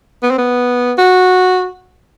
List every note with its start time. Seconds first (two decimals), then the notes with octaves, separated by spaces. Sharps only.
0.23 B3
0.31 C4
0.38 B3
0.98 F#4